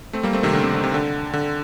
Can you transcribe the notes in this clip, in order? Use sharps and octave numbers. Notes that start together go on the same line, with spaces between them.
A3 C4
G3 A#3
A3 C4
C3 D#3
D3
C3
D3
C3
D3
D3